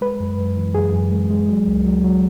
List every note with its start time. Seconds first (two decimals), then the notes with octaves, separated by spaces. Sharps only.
0.01 G#3 B4
0.20 F#2
0.38 F#2
0.57 E3
0.75 F#2 G#4
0.93 F#2
1.12 G#3
1.31 G#3
1.49 F#3
1.67 C#2
1.86 F#3
2.04 F#3